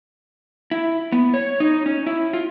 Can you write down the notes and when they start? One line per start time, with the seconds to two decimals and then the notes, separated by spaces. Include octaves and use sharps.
0.71 E4
1.12 B3
1.34 C#5
1.60 D#4
1.86 C#4
2.07 E4
2.33 F4